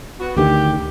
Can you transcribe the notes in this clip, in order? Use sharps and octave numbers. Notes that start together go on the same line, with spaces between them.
B3 F#4
D2 D3 D#3 G4